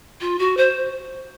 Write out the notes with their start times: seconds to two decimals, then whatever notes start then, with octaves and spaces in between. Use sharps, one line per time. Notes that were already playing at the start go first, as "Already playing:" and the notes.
0.21 F4
0.39 F#4
0.57 C5